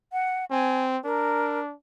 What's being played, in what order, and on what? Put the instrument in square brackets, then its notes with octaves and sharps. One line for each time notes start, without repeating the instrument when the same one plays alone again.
[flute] F#5
[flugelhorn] C4 [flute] G#5
[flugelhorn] D4 [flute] A#4